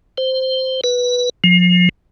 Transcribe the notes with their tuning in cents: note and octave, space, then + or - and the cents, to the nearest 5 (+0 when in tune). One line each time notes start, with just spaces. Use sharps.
C5 -5
B4 -10
F3 +35